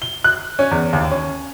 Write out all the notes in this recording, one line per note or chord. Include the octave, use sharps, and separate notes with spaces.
G7
F#6
C#4
E2
D#2
C#4